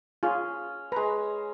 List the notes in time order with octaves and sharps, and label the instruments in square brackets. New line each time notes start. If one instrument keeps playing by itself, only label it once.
[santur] C#4 [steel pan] F4 G#4
[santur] G#3 A#5 [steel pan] B4